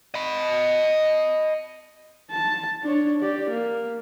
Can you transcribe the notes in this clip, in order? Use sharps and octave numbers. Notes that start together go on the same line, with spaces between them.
D#5 B5
A5
D4 C#5
G4 D5
A#3